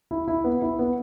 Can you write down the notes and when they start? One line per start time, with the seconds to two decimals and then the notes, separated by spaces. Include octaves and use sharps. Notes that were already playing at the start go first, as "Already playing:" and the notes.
0.11 E4
0.28 E4
0.44 B3
0.62 E4
0.79 B3